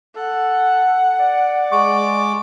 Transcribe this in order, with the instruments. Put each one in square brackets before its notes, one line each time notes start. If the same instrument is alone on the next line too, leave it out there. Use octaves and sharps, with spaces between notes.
[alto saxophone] A4 [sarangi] F#5
[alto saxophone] D5
[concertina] G#3 D6 [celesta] C#6